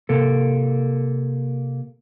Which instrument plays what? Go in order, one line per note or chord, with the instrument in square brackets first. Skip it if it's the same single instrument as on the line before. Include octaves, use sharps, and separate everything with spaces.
[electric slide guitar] C3 A#3 A4